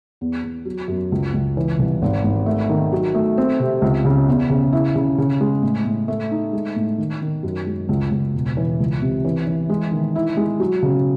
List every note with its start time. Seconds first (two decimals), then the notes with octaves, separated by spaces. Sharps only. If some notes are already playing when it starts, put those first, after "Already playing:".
0.21 E2
0.44 E2
0.65 F#3
0.88 F#2
1.12 C#2
1.34 C#2
1.57 E3
1.79 C2
2.02 G#1
2.24 G#1
2.46 A3
2.69 D#3
2.92 F#3
3.15 A3
3.38 C4
3.60 C3
3.82 C#2
4.05 C#3
4.28 E2
4.50 C#3
4.73 E4
4.96 C#3
5.18 C#3
5.41 G#3
5.62 A2
5.85 A2
6.08 A3
6.31 D#4
6.53 G#3
6.76 A2
6.98 D#3
7.22 D#3
7.43 F#2
7.66 G#3
7.89 C#2
8.11 C#2
8.35 E1
8.57 E3
8.80 C#2
9.01 C3
9.24 E3
9.47 E3
9.69 G#3
9.92 D#3
10.16 E4
10.37 G#3
10.60 F#3
10.83 C#3